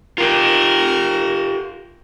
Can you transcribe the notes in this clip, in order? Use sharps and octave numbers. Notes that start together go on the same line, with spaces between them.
F4 G4 A#4